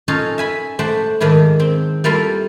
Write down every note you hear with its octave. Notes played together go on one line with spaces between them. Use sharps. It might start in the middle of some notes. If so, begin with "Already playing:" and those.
C#4 D#4 F4 A4 C#5 F5
E5 G#5 B5
A3 C5 D5 F#5
G#2 D#3 D4 E4
C4
G3 A#3 E4 F4 A4